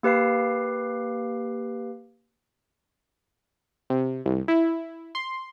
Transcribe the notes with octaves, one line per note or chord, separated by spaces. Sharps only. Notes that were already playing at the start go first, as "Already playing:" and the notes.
A#3 G4 B4 F5 C7
C3
C2
E4
C6